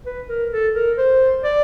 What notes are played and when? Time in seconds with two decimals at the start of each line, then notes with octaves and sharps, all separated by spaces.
0.06 B4
0.29 A#4
0.52 A4
0.75 A#4
0.98 C5
1.44 D5